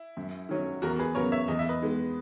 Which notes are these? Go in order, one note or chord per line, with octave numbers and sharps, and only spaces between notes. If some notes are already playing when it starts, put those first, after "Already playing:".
Already playing: E4
F#2
D#3 F#3 C#4
E2 F#4 A#4
G#4 B4
C#3 F#3 B3 A#4 C#5
C#5 E5
E2 D#5
E5
B4 D#5
D#3 G#3 B3